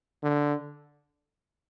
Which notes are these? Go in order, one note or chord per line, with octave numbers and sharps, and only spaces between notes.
D3